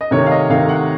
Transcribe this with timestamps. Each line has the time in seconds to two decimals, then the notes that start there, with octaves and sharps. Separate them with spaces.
0.01 D#5
0.11 C3 D#3 A3 C#5
0.26 F5
0.31 D#5
0.50 C3 D#3 A3 F5
0.69 F#5